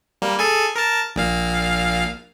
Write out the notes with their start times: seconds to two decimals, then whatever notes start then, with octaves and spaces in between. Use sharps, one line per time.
0.22 G3 A#3
0.39 G#4 A4 G#5
0.75 A#4 A5
1.16 A#1 A#2 F5